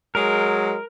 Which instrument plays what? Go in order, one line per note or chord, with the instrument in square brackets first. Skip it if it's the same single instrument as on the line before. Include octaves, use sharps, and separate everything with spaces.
[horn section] F#3 G#3 [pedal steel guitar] A#4